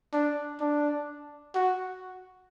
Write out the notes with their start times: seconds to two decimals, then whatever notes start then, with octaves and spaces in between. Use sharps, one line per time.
0.13 D4
0.60 D4
1.55 F#4